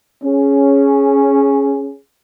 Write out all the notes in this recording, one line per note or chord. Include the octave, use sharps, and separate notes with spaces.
C#4 G#4